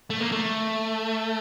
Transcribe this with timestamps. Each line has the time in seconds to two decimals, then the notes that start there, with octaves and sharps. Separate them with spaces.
0.10 A3
0.20 A#3
0.32 A3